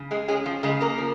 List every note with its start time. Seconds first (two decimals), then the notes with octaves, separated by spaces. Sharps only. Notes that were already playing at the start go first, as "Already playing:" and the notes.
Already playing: C#3
0.11 G#3 G#4
0.28 G#3 C#4 G#4
0.46 F3 F4
0.63 C#3 G#3 G#4
0.81 A#3 A#4
0.98 F3